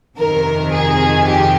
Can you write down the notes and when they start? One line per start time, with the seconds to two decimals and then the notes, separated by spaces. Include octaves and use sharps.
0.17 F2 C3 D#3 A#4
0.72 G#4
1.28 G4